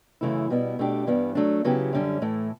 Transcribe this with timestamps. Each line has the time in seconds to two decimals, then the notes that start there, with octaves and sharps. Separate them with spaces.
0.21 F#2 C#3 E3 A3 E4
0.50 B2 G3 B3 E4
0.79 B2 A3 D4 G4
1.07 G2 E3 G3 B3
1.35 F#3 A3 D4
1.64 C#3 F#3 B3 E4 G4
1.93 F#2 D3 G3 C#4
2.22 A2 E3 A3